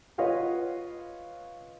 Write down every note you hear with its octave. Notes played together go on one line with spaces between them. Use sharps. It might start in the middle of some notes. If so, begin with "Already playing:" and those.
F4 B4 C#5 D#5 F5 F#5